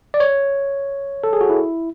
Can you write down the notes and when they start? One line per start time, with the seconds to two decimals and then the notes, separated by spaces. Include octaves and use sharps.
0.14 D5
0.20 C#5
1.24 A4
1.33 G#4
1.41 F#4
1.50 E4